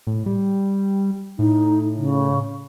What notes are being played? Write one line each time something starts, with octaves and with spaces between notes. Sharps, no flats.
A2
G3
A2 D#4
C#3